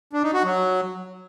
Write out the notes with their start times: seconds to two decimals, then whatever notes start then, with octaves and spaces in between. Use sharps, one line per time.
0.13 D4
0.23 D#4
0.34 F#4
0.44 F#3